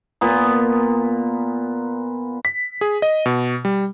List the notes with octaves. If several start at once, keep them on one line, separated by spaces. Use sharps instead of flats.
A#2 B3
B6
G#4
D#5
B2
G3